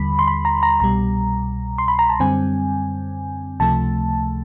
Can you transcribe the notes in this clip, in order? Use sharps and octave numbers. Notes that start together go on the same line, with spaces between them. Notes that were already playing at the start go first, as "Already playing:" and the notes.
Already playing: D#2 D3 G3 B5
C6
B5
A#5
A#5
C2 B2 G3 A#5
C6
B5
A#5
A5
F#2 D3 G3 C4 G#5
C#2 C3 F3 A3 A5